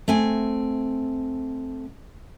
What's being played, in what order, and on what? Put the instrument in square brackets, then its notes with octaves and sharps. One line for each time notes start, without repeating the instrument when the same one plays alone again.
[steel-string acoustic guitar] A3 C4 G#5